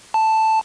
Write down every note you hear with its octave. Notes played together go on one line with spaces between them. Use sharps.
A5